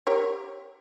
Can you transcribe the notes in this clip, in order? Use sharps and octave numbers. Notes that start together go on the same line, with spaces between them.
G4 A#4 C#5